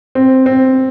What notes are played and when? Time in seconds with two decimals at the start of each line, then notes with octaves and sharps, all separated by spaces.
0.15 C4
0.46 C4